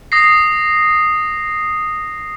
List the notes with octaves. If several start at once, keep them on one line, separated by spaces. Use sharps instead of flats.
D#6 A#6 C7